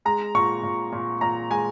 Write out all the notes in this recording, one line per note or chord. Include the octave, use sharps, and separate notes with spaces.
G#3 A#5
A#2 C#6
A#2
A#2
A#2 A#5
G#3 G#5